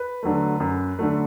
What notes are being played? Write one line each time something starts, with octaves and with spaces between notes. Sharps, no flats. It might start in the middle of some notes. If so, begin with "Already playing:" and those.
Already playing: B4
D3 F#3 A3
F#2
D3 F#3 A3